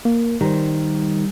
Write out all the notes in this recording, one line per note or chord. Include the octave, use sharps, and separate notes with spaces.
A#3
D#3 G3 C5